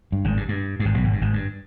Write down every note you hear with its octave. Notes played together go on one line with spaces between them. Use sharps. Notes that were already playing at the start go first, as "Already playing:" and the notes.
G2
G#1 G#2
G2
G2
G2
G#1 G#2
B1 B2
G#1 G#2
G2
G#1 G#2
G2